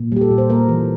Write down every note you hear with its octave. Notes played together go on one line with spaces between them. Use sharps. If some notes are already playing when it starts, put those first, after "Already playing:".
Already playing: A#2
G3 G4
A4
A#2
C5
A#3 A#4
E3